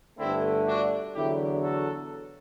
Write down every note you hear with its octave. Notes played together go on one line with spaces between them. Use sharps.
G1 G2 D3 A3 C4 E4
D4 F#4
E2 D3 F#3 E4 G4
F#4 A4